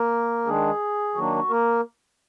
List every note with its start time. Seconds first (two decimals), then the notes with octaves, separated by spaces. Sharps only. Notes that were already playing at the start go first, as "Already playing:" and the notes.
Already playing: A#3 A#4
0.46 D#3 G#3 D4 G#4
1.15 D#3 F#3 A#3 D4 F#4
1.50 A#3 A#4